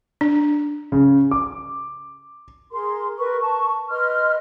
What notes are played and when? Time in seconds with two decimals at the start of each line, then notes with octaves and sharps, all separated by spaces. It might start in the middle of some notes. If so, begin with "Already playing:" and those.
0.21 D4
0.92 C#3
1.31 D6
2.71 G#4 A#4 C6
3.17 A#4 B4 C#6
3.40 A5 C#6
3.90 B4 D#5 C6 F6